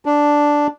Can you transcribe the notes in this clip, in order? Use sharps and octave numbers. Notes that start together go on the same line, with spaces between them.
D4